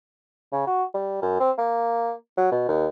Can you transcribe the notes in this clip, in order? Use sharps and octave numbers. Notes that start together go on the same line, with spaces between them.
C#3
F#4
G3
F#2
C4
A#3
F#3
B2
D#2